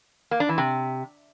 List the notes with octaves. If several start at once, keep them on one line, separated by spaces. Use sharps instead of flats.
A#3
D4
E3
C3